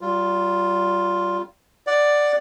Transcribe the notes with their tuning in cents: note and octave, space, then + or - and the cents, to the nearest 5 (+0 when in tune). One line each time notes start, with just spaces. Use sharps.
G3 -35 F4 +0
D5 +5 F#5 +0